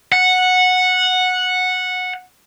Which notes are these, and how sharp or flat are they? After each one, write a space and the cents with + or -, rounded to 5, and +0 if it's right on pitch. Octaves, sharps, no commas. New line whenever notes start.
F#5 -10